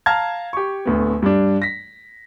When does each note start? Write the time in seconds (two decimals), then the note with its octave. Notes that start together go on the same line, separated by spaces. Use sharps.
0.06 F5 A5 A#5 F6 G#6
0.53 G4 C#6
0.85 D1 D2 B3
1.22 G2 G3 D4
1.62 A#6 B6